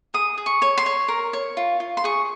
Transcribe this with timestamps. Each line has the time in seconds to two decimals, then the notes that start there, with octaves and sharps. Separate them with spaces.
0.14 G#4 D#6
0.38 G#4
0.46 C#6
0.62 C#5
0.78 C6
0.86 C#5
1.08 A#4
1.33 C#5
1.57 F4
1.80 F4
1.97 C6
2.04 G#4 C#6